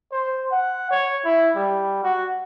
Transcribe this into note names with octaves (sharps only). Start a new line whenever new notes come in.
C5
F#5
C#5
E4
G3
F#4